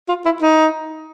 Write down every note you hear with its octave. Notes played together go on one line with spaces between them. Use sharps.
F4
E4
D#4